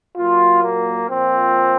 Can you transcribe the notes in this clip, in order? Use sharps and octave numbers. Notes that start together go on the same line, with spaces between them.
A#2 F#3 F4
A#3
A#2 F3 C4